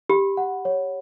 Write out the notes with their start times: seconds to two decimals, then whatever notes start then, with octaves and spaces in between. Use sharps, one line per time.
0.10 G4 B5
0.37 F#5
0.65 C#5